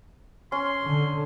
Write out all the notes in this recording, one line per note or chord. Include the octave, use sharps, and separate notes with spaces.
C#4 C6
D3